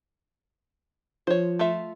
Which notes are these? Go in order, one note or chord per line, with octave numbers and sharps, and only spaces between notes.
F3 C5 C#5
A3 F4 E5